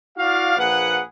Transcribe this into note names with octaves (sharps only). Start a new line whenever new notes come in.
E4 F#4 D5 F5
A#1 A#3 G#4 B4 F#5